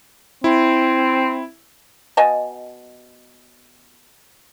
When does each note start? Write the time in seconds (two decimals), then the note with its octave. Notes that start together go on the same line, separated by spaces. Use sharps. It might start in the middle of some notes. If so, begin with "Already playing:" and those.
0.44 C4 E4
2.17 B2 D#5 G#5 A5